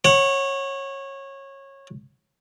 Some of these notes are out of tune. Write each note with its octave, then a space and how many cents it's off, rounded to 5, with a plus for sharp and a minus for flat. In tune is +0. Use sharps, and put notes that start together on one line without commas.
C#5 -20 F#5 +0